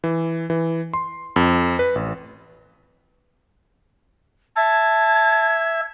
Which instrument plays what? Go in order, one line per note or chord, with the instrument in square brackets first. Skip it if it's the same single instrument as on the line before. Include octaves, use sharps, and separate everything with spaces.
[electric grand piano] E3
E3
C6
F2
B4
A1
[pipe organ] E5 [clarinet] A5 [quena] G#6